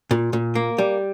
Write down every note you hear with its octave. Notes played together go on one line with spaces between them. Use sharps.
A#2
A#2
A#3
G3